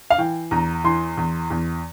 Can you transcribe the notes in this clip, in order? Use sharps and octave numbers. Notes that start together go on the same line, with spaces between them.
F5
E3 G5
E2 A#5
E3 C6
E2
E2